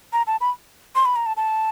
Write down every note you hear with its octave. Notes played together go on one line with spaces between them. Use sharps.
A#5
A5
B5
C6
B5
A#5
A5
A5